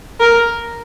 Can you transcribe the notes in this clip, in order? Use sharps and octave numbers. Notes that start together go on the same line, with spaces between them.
A#4